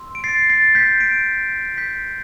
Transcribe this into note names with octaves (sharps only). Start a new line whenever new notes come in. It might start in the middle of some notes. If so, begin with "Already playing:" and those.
Already playing: C6 E6
D7
A6 C7
A6 C7
G6 B6
B6 D7
G6 B6